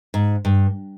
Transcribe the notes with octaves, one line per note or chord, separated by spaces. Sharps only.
G#2
G2